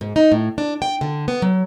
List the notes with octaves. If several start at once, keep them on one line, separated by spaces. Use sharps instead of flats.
G#2
D#4
A2
D4
G5
D3
B3
F#3